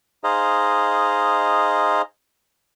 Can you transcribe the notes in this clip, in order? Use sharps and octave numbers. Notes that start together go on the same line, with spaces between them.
D#4 G#4 C5 D#5 F5